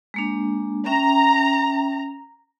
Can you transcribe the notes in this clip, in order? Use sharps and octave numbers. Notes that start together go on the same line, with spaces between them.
G#3 A#3 D4
C#4 E5 G5 A#5